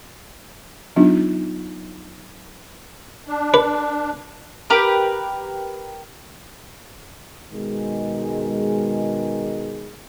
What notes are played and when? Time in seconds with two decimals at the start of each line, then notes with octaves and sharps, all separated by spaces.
0.96 F#3 B3 D4 D#4 F4
3.28 D4
3.54 B4
4.70 G4 A#4 B4
7.51 B2 D#3 G#3